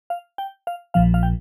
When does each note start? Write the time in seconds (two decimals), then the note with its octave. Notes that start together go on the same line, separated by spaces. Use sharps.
0.10 F5
0.38 G5
0.67 F5
0.94 A#1 A#2 F3 F5
1.14 F5
1.23 G5